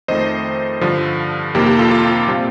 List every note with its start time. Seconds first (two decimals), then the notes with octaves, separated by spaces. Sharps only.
0.08 F2 D#3 A3 C5 D#5
0.81 G2 D3 F3
1.55 F2 C3 D#3 A#3 G4
1.66 G4
1.79 F4 A4
1.91 F4 A4
2.27 A#2 G3 C4